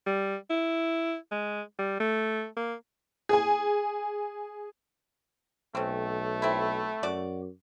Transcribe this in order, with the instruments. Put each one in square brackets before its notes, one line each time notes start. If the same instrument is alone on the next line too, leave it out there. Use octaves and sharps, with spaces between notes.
[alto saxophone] G3
E4
G#3
G3
A3
A#3
[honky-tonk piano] G#4 G#5
[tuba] B1 [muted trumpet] A3 [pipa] C4 C#4
[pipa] C4 E4
[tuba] F#2 [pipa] F#4 D5